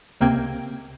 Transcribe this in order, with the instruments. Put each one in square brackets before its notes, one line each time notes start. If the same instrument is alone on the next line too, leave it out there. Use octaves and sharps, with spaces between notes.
[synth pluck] C#2 C3 A#3 C4 G5 G#6